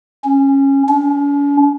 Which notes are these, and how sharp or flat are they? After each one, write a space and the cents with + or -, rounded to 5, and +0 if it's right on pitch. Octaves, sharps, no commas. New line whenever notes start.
C#4 -15
C#4 +45